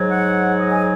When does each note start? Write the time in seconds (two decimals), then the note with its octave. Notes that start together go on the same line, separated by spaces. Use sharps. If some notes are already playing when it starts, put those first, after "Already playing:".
Already playing: G#2 F#3
0.11 F#5
0.57 D#5
0.70 G#5